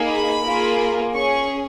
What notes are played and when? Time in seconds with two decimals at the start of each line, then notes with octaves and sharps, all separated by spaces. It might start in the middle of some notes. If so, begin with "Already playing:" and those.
Already playing: A#3 D#4 G#4
0.09 B5
0.44 A#3 F4 G#4
1.15 C#4 G#4 C#6